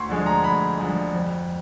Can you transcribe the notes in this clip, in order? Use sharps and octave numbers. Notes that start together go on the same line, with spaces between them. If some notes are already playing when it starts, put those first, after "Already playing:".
Already playing: D2 C6 C#6
D3 F3 G#3
A#5
D2 B5
D3 F3 G#3
F2